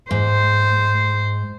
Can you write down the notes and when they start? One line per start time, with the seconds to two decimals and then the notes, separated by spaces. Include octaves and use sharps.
0.11 G#2 C5